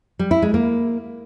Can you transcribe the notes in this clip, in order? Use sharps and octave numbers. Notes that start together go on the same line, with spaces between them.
G3
E4
G#3
A#3